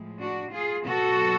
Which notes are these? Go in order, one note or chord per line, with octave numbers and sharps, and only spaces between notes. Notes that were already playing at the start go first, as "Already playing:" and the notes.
Already playing: A2 F3 G#3
D4 F#4
F4 G#4
B2 F#3 F#4 A4